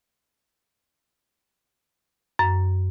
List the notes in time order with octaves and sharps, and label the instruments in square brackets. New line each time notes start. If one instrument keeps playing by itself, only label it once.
[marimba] F#2